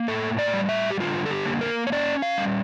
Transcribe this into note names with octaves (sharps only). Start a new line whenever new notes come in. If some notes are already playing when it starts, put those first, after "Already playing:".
Already playing: A#3
A2 A4
D5
G3
E5
G4
D3 F4
A4
G4
A#3
A#4
C#5
C#4 D5
F5
G3